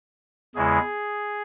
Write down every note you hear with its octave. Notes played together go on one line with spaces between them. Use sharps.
E2 C#3 G#3 B3 E4 G#4